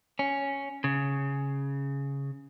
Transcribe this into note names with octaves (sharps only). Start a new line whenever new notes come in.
C#4
C#3